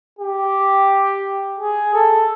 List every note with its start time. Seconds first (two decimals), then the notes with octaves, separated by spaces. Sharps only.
0.19 G4
1.58 G#4
1.94 A4